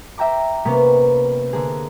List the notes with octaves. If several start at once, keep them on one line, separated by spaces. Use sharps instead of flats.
E5 G5 A#5 D6
C3 A#3 B3 C#4
D3 A#3 G#4